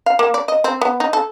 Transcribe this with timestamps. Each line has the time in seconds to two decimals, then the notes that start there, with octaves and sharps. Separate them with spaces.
0.06 F5
0.19 A#3
0.34 D5
0.48 D#5
0.64 C4
0.81 B3
1.00 D#4
1.13 A4